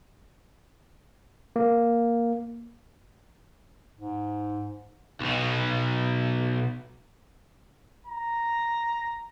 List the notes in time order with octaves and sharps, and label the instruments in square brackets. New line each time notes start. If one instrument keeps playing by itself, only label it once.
[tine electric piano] A#3
[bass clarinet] G#2
[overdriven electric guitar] B1 B2
[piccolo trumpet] A#5